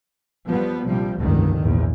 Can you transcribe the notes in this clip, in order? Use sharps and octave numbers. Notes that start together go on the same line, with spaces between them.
F3 G3 B3
A#1 C3 F3 G3
F1 C#2 G2 D3 D#3
A#1 E2 G#2